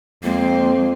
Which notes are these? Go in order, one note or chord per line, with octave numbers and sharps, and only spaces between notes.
F2 G#3 A#3 C4